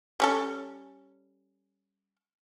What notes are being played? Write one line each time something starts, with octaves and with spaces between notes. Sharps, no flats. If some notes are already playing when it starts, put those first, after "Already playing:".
G3 C#4 A4